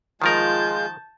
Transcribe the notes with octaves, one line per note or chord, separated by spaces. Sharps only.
D#3 F3 G#3 F4 A#4 A5 G6